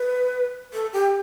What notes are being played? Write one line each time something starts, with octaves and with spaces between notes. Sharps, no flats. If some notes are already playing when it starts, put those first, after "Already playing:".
Already playing: B4
A4
G4